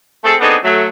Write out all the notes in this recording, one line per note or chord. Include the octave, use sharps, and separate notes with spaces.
A3 C4 G#4 A4
B3 C4 D4 D#4 G#4 A4
F#3 A3